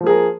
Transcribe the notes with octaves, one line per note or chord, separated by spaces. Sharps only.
F3 A#3 G#4 A#4